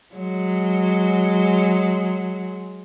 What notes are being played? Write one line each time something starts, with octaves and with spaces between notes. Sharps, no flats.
F#3 G#3